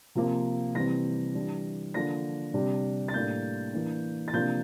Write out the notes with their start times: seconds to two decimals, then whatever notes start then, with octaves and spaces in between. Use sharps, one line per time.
0.15 C3 F3 A#3
0.75 C3 E3 G3 C4 A#6
1.34 E3 G3 D4
1.94 D3 F3 A#3 D4 A#6
2.54 C3 G3 D4
3.08 A6
3.14 A2 G3 A#3 D4 G6
3.74 E3 A#3 D4
4.28 A6
4.33 C3 F3 A#3 D4 G6